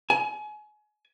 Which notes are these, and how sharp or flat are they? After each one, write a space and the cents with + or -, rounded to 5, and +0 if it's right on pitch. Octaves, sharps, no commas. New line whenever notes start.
G#5 +30